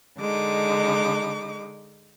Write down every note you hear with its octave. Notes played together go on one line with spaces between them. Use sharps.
D3 G#3 D#4 D6